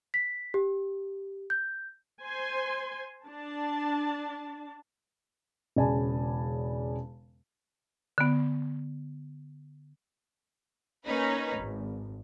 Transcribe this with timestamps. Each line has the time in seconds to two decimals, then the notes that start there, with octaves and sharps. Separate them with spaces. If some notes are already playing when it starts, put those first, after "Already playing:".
0.14 B6
0.54 G4
1.50 G6
2.21 C5 G#5 C6
3.27 D4 A5
5.76 E1 C#3 D5 G#5 A5 B5
8.18 D3 B3
11.05 A#3 C#4 D#4 B4
11.57 G#1